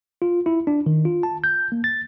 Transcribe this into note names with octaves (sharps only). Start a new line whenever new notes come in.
F4
E4
D4
D#3
F4
A5
G6
A#3
A6